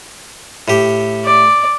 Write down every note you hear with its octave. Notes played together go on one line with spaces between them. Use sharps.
A2 G4
D5